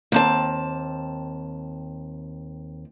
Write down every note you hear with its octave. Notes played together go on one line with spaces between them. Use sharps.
D#2 C4 A5